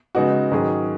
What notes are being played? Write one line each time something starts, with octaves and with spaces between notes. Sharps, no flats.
C#3 G#3 B3 D#4 F#4
G#2 D#3 F#3 C#4 G#4